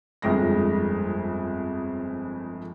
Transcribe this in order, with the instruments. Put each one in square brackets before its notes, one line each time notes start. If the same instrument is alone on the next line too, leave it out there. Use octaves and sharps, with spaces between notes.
[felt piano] G1 F2 G#3 A#6